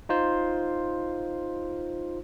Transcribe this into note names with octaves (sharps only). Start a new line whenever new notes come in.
D#4 F4 C5